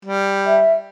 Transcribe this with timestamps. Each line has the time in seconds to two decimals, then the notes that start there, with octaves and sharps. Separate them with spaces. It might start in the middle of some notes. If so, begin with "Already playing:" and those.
0.05 G3
0.46 E5